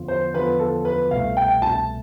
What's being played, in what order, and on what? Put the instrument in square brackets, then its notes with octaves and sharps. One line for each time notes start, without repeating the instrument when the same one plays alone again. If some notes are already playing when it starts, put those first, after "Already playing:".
Already playing: [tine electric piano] E2 D3 F3 B3 F4
[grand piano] C5
[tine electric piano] E2 D3 F3 B3 F4 [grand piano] B4
[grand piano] A4
B4
[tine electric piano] C2 B2 A3 [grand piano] F5
[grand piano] G5
A5